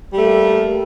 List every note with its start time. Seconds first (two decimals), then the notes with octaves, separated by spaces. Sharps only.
0.13 G3
0.18 A3
0.22 A#3